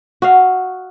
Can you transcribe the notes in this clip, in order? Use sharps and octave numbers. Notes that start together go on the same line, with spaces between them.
F#4 D#5 F5